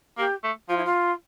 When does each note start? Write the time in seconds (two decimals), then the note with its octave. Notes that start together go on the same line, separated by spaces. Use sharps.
0.18 A#3 G4
0.44 A3
0.69 F3 F4
0.77 E4
0.85 F4